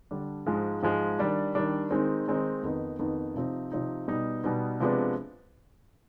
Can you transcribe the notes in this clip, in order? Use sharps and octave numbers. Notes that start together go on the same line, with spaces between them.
D3 G3 D4
G#2 F3 G#3
G#2 F3 G#3
D#3 G3 D4
D#3 G3 D4
D#3 G#3 C4 D#4
D#3 G#3 C4 D#4
F2 D#3 B3 D#4
F2 D#3 B3 D#4
C3 F3 C4 D#4
C3 F3 C4 D#4
B2 G3 B3 D#4
B2 G3 B3 D#4
C3 F3 G#3 B3 D4